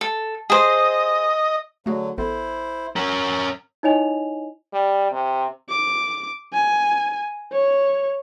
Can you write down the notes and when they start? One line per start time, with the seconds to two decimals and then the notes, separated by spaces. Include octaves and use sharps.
0.01 A4
0.50 G#4 C5 D#5
1.86 D3 F#3 A3 F#4 G#4
2.18 A1 B3 E4 A4 C5
2.96 C#4 F#4 A#4
3.83 D#4 E4 C#5 D#5 G#5 F7
4.73 G3
5.12 C3
5.69 D6
6.53 G#5
7.52 C#5